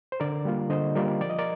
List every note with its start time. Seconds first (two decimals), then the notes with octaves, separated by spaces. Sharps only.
0.12 C5
0.20 D3 A#4 D5
0.45 G3 A#3 F4
0.70 D3 C5 D#5
0.95 G3 A#3 F4 A#4 D5
1.21 F3 D5
1.30 D#5
1.39 A#4 D5